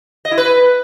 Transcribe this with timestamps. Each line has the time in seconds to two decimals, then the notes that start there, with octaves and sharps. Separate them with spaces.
0.25 D#5
0.31 E4
0.38 B4